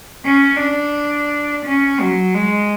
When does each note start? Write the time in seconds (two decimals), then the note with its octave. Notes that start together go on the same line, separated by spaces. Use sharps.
0.25 C#4
0.60 D4
1.65 C#4
2.00 F#3
2.34 G#3